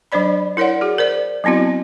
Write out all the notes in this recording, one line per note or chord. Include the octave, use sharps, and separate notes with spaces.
F#3 D4 C5 D5 B5
E4 A#4 C#5 D5 F#5
F#4 G#4
A#4 C5 D5
F#3 B3 C4 E4 F#4